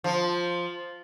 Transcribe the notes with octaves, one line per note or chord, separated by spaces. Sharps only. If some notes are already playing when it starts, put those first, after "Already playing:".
F3